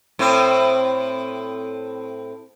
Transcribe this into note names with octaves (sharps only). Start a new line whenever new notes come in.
A2 C4